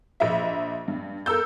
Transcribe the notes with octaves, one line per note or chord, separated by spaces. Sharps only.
A#1 D#5 E5
G2
A4 A#4 E6 G6